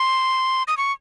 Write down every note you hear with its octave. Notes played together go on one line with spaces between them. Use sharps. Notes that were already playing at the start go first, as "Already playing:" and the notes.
Already playing: C6
D#6
C#6